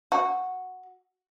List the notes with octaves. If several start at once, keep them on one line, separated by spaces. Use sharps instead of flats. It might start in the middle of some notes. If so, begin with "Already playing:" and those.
F#4